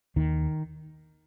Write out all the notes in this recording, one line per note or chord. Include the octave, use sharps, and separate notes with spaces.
D#2 D#3